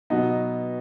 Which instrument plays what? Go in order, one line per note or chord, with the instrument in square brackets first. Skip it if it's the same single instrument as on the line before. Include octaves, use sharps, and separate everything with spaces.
[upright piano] B2 F#3 B3 D#4